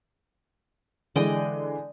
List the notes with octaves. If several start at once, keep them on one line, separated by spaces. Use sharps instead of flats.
D3 E3 G#3 D5 D#5 G5